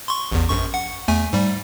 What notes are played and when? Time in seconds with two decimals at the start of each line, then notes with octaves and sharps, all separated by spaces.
0.08 C6 C#6
0.32 A1 E2
0.48 A#1 F#2 C#6
0.74 F#5
1.08 E2 A3 G#5
1.33 G#2 G3